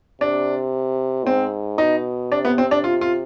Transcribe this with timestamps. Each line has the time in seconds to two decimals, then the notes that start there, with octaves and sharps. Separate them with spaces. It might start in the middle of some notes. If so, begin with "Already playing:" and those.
0.21 C3 D4
1.26 G#2 C4
1.78 B2 D#4
2.32 C3 D4
2.45 B3
2.58 C4
2.71 D4
2.84 F4
3.01 F4